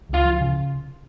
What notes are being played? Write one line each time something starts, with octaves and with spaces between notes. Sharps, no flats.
C#2 F4
F3
C#3